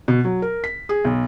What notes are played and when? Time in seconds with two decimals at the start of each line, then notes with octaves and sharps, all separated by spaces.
0.08 B2
0.24 F#3
0.42 A#4
0.64 B6
0.89 G#4
1.05 B1